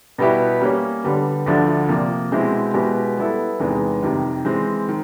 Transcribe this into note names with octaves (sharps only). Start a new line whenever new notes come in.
B2 G3 B3 E4 G4
G3 A#3 C#4
D3 G3 B3
D2 D3 F3 A3 D4
C3 F3 A#3
B2 G#3 C4 E4 G4
B2 G#3 B3 E4 G4
G3 B3 E4 A4
E2 C3 D#3 G#3 B3
F2 C3 D#3 G3
E3 G#3 C4
D#3